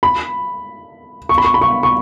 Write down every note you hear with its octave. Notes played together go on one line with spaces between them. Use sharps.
B5
C#6
B5
C#6
B5
C#6
C#6